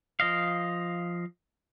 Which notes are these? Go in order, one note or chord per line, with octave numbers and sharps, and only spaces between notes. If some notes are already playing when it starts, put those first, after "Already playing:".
F3 D#5 F5